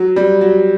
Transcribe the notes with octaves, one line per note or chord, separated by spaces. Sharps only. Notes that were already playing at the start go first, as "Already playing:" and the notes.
Already playing: F#3
G3
F#3